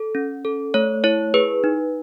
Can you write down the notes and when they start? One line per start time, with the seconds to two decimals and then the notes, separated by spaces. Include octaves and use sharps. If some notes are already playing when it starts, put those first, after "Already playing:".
Already playing: A4
0.15 C#4
0.45 A4
0.74 A3 C#5
1.04 E4 C#5
1.34 G#4 B4
1.64 D#4